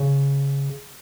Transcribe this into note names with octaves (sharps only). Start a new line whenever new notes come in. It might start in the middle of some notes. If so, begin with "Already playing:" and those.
Already playing: C#3